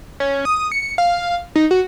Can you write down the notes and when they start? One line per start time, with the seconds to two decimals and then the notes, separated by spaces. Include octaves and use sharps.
0.20 C#4
0.45 D#6
0.72 C#7
0.98 F5
1.56 D#4
1.71 F#4